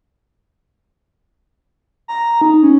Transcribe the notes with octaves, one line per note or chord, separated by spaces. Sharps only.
A#5
D#4
C#4